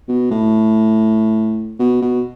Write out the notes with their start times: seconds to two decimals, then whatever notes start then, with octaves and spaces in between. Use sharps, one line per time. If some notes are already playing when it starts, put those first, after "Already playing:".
0.08 B2
0.31 A2
1.79 B2
2.02 B2